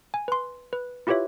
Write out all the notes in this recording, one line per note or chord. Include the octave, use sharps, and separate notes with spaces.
G#5
B4 C6
B4
E4 F4 G4 B4 C#5 E5